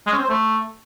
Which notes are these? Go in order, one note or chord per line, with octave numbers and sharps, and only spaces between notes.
G#3
C#4
C4
C5
A3